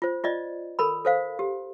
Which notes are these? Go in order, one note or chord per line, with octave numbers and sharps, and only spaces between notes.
F4 C5
F4 D5 D#5
A4 A#4 B5
A4 C5 F5
G4